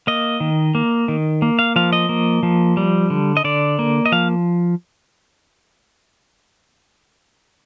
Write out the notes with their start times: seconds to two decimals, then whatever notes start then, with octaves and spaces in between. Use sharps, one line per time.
0.07 A#3 D#5
0.40 D#3
0.75 A#3
1.08 D#3
1.42 A#3
1.59 F5
1.76 F3 F5
1.93 D#5
2.09 A#3
2.43 F3
2.77 G3
3.10 D3
3.37 D#5
3.44 D3 D5
3.79 A#3
4.06 D#5
4.12 F3 F5